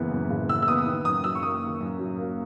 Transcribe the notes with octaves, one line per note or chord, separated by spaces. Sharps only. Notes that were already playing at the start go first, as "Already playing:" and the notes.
Already playing: F#1 F#2 E3 B3
F#2
F#1
E3 E6
E6
B3 D#6
D#3
F#2 D#6
F#3 E6
C#6
A#3 D#6
D#3
F#2
F#3
A#3